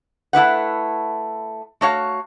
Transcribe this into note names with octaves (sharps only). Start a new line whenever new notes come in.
A3 E4 B4 F#5
A3 F#4 C#5 F5